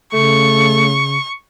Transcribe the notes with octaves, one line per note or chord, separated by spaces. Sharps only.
C#3 A3 C#6